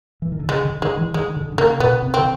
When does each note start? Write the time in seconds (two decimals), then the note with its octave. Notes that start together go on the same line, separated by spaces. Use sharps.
0.22 E3
0.32 D#3
0.40 D3
0.48 C#3 G#3
0.65 D3
0.82 D#3 G#3
0.98 E3
1.14 D#3 G#3
1.37 D3
1.52 D3
1.58 C#3 A#3
1.80 B2 B3
2.02 C3
2.14 D3 C4